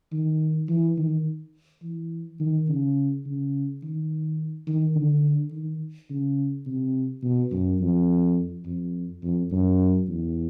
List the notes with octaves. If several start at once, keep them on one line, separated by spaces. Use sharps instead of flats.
D#3
E3
D#3
E3
D#3
C#3
C#3
D#3
D#3
D3
D#3
C#3
C3
B2
F#2
F2
F2
F2
F#2
E2